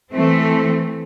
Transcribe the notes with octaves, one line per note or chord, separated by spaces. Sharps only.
E3 A3 C4